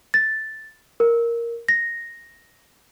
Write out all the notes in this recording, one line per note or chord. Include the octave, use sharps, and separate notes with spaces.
A6
A#4
A#6